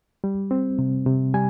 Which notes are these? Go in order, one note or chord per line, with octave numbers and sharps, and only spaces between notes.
G3
C4
C3
C3
G3 G#5